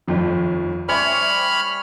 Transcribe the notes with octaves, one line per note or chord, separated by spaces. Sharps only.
G1 F2 D#3
G3 C#4 C5 C#5 E5 B5 F6